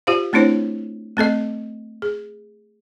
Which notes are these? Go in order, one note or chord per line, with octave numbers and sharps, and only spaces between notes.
F4 G4 C5 F5
A3 C4 D4 E4 C5 C#5
A3 C4 A4 D#5
G#4